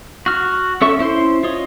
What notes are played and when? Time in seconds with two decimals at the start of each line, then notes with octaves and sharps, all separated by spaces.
0.26 F#4 F6
0.81 C#4 A4 E5 C#6
0.99 C#4 E4 C5 C6
1.43 F4 C#5 D#5